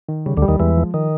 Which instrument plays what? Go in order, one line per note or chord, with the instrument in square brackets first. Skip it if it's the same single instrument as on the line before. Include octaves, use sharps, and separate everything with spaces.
[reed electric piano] D#3
[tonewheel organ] C#3 [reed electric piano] G3
[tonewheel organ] D2 D3
[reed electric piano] G3
[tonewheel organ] D#2 D#3
[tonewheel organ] E2 E3 [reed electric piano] G#3
[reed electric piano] F3
[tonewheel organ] D#3